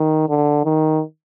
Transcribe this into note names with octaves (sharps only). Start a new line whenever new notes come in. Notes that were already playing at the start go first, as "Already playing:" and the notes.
Already playing: D#3
D3
D#3